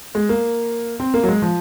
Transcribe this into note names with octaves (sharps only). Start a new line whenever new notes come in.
G#3
A#3
C4
A#3
F#3
G#3
F3